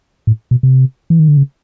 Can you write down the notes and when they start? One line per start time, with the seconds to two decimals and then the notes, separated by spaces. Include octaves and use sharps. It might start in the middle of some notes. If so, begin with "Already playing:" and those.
0.27 A2
0.51 B2
0.63 C3
1.10 E3
1.19 D#3
1.28 D3
1.37 C#3